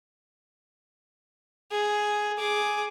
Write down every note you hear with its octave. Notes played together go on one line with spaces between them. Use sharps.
G#4
G#4 D6